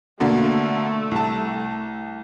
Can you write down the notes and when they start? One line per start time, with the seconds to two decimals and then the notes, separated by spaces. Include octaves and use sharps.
0.20 B2 D3 A3 A#3
1.11 C2 A5